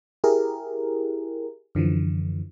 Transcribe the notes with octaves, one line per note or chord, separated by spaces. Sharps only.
E4 G4 G#4 A#4
F#2 D3 E3 F3